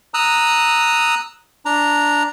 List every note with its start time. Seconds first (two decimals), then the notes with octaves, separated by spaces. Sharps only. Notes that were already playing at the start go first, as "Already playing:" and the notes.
0.14 A#5 D#6 E6 F#6
1.65 D4 A#5